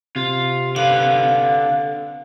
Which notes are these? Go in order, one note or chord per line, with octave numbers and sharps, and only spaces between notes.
C3 F4
D3 B4 F5